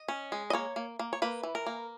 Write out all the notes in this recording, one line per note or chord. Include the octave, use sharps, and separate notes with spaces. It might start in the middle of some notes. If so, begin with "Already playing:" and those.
Already playing: D#5
C#4
G#3
D#5
A#3 C#5
A#3
A#3
C#5
A#3 B4
E3
A#4
A#3